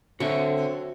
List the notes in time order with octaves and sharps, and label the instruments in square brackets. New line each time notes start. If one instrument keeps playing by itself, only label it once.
[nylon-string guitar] D3 [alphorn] C4 [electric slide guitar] F#4 C#5 E5 [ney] A4